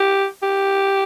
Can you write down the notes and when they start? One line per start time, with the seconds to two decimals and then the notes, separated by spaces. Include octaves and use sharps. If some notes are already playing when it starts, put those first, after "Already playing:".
Already playing: G4
0.43 G4